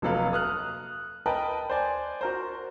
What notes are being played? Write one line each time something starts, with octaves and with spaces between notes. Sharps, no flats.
F1 F#3 A#3 A4 B4 F5
D#6 F6 F#6
A#4 B4 D#5 G5 A5
C5 D5 G#5
F#4 A#4 C5